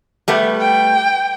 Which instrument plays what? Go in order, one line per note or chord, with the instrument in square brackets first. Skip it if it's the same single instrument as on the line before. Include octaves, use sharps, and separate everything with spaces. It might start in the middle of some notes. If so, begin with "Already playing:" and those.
[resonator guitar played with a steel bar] G3 A3 B3
[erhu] G5